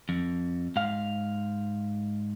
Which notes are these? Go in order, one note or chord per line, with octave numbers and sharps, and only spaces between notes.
F2
G#2 F5